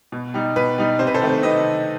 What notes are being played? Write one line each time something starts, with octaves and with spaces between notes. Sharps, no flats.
B2
G3 D#4
B2 B4
G3 D#4
C3 C5
B4
A4 C5
D#3 A3 C4
C3 B4 D#5